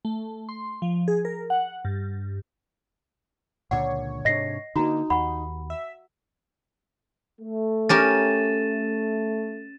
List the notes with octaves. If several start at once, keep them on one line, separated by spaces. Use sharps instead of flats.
A3
C6
F3
G#4
A#4
F#5
G2
C#2 A#2 D3 C#5 F#5 D6
G#2 C3 D4 D#5 A#6 C7
D3 A#3 D#4 F#4 A#5
D#2 F#5 B5 C#6
E5
A3
C#4 G4 A#4 A6 D#7 E7